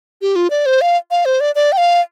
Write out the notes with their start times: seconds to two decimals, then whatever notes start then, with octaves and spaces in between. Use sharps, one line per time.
0.22 G4
0.36 F4
0.50 D5
0.66 C5
0.81 F5
1.11 F5
1.25 C5
1.40 D5
1.55 D5
1.72 G5
1.77 F5